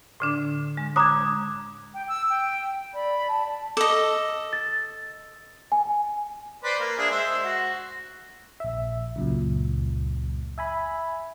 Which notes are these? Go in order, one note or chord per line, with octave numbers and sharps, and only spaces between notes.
A2 D3 D4
G#3
A#5 D6 D#6 F#6 G#6
G5
E6
G5
D5 B5
A5
A4 D#5 D6
A6
G#5
B4 C5 D5
A#3
D4 G#4 E5
G#3 C5 E5
F#4
A#1 E5
C#2 F#2 A#2
E5 G#5 B5